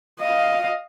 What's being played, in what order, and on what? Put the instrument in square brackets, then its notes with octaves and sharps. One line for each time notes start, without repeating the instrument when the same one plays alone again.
[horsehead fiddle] D#5 F5